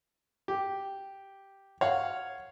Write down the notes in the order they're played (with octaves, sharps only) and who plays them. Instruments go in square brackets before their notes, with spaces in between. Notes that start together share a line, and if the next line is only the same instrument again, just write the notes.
[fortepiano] G4
C#5 F5 F#5